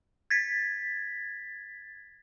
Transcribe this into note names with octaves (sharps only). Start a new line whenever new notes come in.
G#6 A6 B6